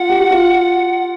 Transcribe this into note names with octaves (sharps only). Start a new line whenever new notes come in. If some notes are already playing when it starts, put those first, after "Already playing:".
Already playing: F4 F#5
G4
F#4
F4